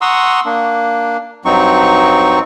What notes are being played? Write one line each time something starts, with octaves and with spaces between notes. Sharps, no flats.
F#5 A#5 C6 C#6 D#6 E6
A#3 D4
G2 F#3 C4 D#4 C#6